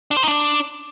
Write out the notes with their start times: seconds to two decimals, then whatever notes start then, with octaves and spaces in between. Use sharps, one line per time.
0.11 D4
0.17 C5
0.22 D#4
0.28 D4